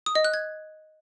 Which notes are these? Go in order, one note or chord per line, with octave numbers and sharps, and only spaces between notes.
D#6
D#5
F#6
G#6